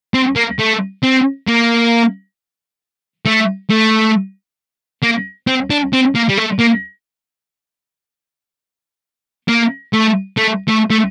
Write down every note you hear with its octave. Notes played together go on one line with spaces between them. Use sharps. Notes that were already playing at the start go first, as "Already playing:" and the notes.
C4
A#3
A3
C4
A#3
A3
A3
A#3
C4
D4
C4
A#3
G3
A3
A#3
A#3
A3
A3
A3
A3